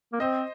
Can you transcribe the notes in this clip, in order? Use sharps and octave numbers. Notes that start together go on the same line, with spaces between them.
A#3
C4 C5 D#5